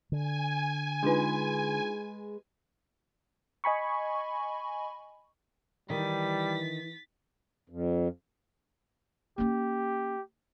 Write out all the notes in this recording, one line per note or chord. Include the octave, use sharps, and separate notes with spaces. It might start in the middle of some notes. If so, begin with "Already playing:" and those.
D3 G#5
G#3 D4 D#4 F4 G#4 B4
D#5 G#5 B5 C#6
D#3 E3 G3 A6 B6
F2
A#3 C#4 G4